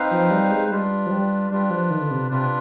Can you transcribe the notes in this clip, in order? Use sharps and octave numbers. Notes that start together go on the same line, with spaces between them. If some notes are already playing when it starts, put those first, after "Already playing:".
Already playing: C4 D#4 B4 F5
F3
G3
G#3
G3 D4 F4 B4
F3
G3
G3 D4 F4 B4
F3
D#3
D3
C3
C3 D4 F4 B4